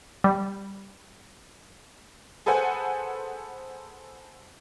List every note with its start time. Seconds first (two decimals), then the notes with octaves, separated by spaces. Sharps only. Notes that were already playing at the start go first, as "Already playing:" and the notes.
0.24 G3
2.46 G#4 A4 B4 C5 F#5 G#5